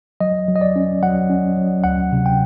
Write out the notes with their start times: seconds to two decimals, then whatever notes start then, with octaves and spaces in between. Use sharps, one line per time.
0.21 F#3 D#5
0.48 F#3
0.56 D#5
0.61 D5
0.76 C#4
1.03 F#3 F#5
1.30 C#4
1.57 F#3
1.84 D2 F#5
2.12 C3
2.26 G5